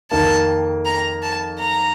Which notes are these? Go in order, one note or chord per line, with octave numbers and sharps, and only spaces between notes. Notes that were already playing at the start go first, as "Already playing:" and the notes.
F2 D#3 A#3 A5
A#5
A5
A#5